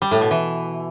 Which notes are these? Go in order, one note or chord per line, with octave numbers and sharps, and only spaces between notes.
G3
A2
B2
E3